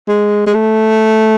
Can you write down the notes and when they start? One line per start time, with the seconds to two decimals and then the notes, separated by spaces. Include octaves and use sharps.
0.08 G#3
0.47 G#3
0.54 A3